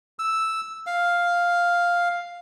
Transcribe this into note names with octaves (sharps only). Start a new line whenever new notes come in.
E6
F5